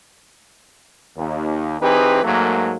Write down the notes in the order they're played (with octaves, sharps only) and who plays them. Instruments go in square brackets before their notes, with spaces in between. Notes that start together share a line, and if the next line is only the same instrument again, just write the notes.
[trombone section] D#2
E3 C4 D#4 G4 G#4 B4
G#2 F#3 A3 A#3